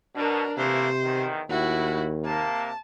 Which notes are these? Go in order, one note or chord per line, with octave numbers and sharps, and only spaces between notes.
B2 D4 A#4
C3 E3 A3 A#3 C5
E2 D#3
D#2 A2 E4 F#4
C3 A#3 A5